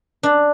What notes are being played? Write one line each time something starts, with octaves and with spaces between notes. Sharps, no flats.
D4